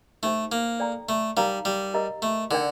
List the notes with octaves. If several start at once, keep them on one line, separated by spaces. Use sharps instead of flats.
A3 D#4 G4 C5 G5
A#3
A4 D5 G5 A#5
A3
G3 D#4 A#4 F5 A#5
G3
G4 A#4 D#5 A#5
A3
D3 D#4 A#4 D5 G5